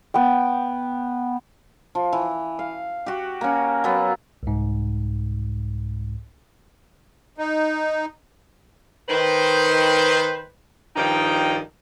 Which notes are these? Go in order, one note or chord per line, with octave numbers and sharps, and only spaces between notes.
B3 G5
F3
E3
F5
F#4 G4
A#3 C#4
F#3 A#3 B3
C2 G#2
D#4
D#3 B4 C5
G2 D#3 F3 D#4 G5